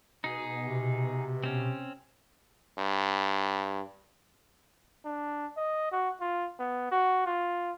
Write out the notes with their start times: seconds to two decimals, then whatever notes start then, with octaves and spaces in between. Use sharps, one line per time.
0.24 B2 D#4 G#4
0.65 C3
1.44 C4 C#4
2.78 G2
5.05 D4
5.57 D#5
5.92 F#4
6.21 F4
6.59 B3
6.92 F#4
7.26 F4